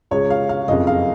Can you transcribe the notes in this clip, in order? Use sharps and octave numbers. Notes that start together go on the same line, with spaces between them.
C#2 C#3 G#3 C#5
F5
F5
F#1 F2 C#3 D#5
F5